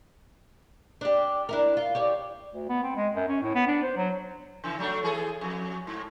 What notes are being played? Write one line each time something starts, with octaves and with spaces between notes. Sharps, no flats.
D4 G4
D4 E4 A#4
F4
G4 C#5 D5
D2
B3
C4
G#3
F#2
C#4
A2
B3
D4
C5
F#3
C#3 E3
F#3 A3 D4
E3 G#4 A4
F2
G#2